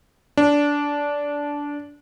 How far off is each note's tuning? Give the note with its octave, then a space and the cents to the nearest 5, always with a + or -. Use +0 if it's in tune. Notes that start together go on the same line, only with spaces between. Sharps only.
D4 -15